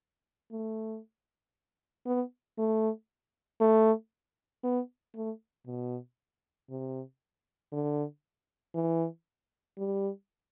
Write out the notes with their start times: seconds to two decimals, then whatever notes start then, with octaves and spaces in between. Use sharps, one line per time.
0.52 A3
2.06 B3
2.58 A3
3.61 A3
4.64 B3
5.15 A3
5.66 B2
6.70 C3
7.72 D3
8.75 E3
9.78 G3